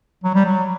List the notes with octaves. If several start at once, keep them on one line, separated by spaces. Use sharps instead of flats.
F#3
G3
F#3